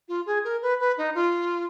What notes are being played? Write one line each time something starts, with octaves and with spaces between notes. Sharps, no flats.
F4
G#4
A#4
B4
B4
D#4
F4